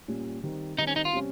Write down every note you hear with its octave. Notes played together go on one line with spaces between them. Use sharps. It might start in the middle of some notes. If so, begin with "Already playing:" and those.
A#2 G3 C#4 G4
D#3 G3 C4
D#3 G3 C4 D#4
C#4
D#4
F4
C3 G3 C#4